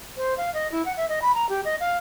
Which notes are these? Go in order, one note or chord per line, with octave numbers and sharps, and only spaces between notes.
C5
F5
D#5
E4
F#5
E5
D#5
B5
A#5
G4
D#5
F5